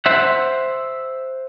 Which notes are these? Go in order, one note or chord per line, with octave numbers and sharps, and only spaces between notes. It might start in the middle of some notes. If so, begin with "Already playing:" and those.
C5 E5 F#5